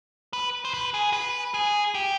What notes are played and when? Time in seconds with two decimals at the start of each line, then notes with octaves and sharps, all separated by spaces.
0.33 B4
0.65 C5
0.74 B4
0.94 G#4
1.13 B4
1.54 G#4
1.95 G4